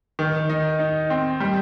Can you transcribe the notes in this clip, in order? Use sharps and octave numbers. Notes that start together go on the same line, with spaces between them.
D#3
D#4
D#4
C4
G3